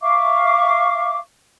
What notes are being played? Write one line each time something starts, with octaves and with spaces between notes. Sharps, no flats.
E5 F5 C#6 D6